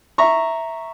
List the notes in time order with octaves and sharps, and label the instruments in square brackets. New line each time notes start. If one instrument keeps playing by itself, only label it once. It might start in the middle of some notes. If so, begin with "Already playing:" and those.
[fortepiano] E5 A#5 C#6